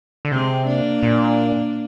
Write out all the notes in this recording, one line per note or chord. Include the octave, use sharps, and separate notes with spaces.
D3
C3 G#3 C4
A#3 D4
A#2